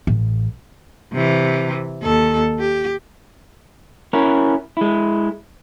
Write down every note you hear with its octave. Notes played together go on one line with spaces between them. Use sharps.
A1
C3 E3
D#2 A4
G4
C#4 E4 F#4 A#4
G#3 E4